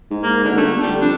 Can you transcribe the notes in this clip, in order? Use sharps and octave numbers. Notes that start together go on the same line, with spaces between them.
G#2
A#3
D2 D3
G1 A3
D3 G3
F2 D4